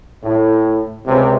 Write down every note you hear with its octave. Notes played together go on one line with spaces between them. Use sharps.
A2
C#2 C3